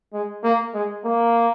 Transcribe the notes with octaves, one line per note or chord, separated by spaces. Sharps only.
G#3
A#3
G#3
A#3